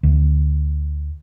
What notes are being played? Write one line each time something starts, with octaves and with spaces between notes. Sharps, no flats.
D2